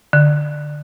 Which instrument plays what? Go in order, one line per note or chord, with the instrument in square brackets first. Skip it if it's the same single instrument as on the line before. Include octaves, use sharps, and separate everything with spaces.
[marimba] D3